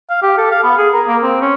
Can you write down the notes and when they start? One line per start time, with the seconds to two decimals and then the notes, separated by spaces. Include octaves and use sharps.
0.10 F5
0.22 G4
0.38 A4
0.51 F5
0.63 B3
0.77 G#4
0.93 A#4
1.08 A#3
1.23 C4
1.42 C#4